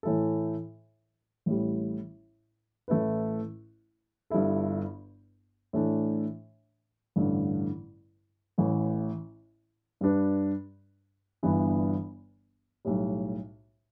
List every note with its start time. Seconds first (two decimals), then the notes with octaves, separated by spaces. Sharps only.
0.03 A2 E3 A3 E4 A4
1.46 A1 A2 G3
2.88 A1 A2 A3 E4 B4
4.30 G1 G2 G3 E4 A4
5.73 A2 E3 A3 D4
7.16 A1 G2 D3
8.58 A1 A2 E3
10.01 G2 G3 D4 B4
11.43 G1 G2 E3 B3 D4
12.85 B1 A2 G3